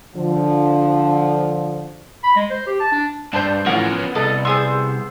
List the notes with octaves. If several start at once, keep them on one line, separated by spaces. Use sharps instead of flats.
D3 F3
B5
G#3
C5
G4
A5
D4
G2 D4 C5 A5 C6 G6
A2 E3 F3 C#4 F4 A#4 F#5
B3
C2 A4 D#5
B3 G#4 C5 C6 E6